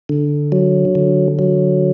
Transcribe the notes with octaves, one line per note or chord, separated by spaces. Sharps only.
D3
F#3
D3
F#3